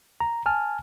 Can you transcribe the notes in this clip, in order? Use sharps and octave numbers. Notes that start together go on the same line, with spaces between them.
A#5
G#5 A5 F6